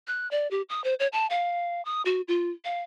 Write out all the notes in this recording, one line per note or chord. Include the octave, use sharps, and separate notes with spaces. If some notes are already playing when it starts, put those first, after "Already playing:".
F#6
D5
G4
D#6
C5
C#5
A5
F5
D#6
F#4
F4
F5